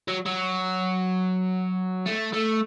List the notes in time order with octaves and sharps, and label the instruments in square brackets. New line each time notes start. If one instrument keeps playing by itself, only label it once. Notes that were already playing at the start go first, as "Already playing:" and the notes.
[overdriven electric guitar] F#3
F#3
A3
A3